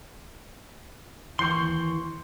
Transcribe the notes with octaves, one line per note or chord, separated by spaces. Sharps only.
D#2 E3 C6 C#6 G6 C7